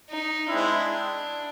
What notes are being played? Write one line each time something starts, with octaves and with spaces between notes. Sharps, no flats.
D#4
G#3 C4 D4 E4